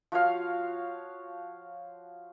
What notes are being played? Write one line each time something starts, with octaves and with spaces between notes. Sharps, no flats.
F3 F#4 C#5 F5